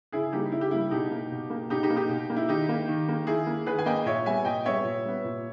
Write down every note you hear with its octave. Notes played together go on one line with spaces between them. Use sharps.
C#3 E4 G#4
G3 A#3 D#4 G4
C#3 E4
G4
G3 A#3 E4
B2 D#4 G4
A#3
B2
A#3
B2 D#4 G4
D#4 G4
A#3
D#4 G4
B2
A#3
E4
D#3 D#4 G4
A#3
D#3
A#3
D#3 E4 G#4
A#3
D#3 G#4 B4
G#5
A#3 D#5 G5
A#2 C#5 E5
G3 B3 E5 G#5
A#2 D#5 G5
G3 B3 C#5 E5
A#2
G3 B3
A#2